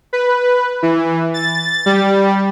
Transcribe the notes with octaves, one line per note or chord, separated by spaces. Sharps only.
B4
E3
A6
G3